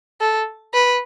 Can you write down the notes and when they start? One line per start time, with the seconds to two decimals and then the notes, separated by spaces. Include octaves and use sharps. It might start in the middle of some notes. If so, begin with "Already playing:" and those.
0.21 A4
0.74 B4